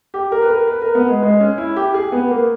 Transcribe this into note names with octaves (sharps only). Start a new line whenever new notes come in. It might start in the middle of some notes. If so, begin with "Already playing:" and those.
G4
A#4
B4
A#4
B4
A#4
B3
G#3
G#3
C#4
E4
G4
G#4
B3
A#3